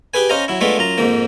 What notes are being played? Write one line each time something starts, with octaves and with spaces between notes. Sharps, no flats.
G4 G#4 B4 G#5
C#4 C5 D#5 F5 A#5
F#3 E4
G#3 A3 B3 D4 F4 A4
F#2 F4 A#5
F2 G#2 F3 A#3